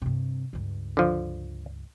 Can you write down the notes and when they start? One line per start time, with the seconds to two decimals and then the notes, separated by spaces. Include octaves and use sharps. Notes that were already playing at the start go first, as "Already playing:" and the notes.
0.02 G2 C3
0.53 C#2 G2
0.97 D3 F3